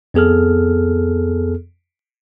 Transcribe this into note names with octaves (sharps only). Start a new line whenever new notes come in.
F2 B3 G#4 A4 F6